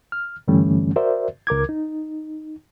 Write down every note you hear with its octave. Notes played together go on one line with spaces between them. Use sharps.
F6
G2 D3 E3 G3 A3 C#4
F#4 A#4 C5 D5 E5
C#2 A#4 D6 G#6
D#4